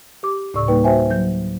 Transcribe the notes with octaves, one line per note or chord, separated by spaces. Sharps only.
G4 D6
D2 A2 C#3 D5 C#6 E6
G3 A#3 D#4 B4 G5
F#4 C5 E5 G5 G#5
F#3 G6